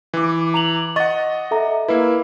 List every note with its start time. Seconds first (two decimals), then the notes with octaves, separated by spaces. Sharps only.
0.14 E3 D6
0.54 A#5 F7 F#7
0.96 D#5 F#5 C#6 A6
1.51 A4 E5 A#5
1.88 A#3 E4 B4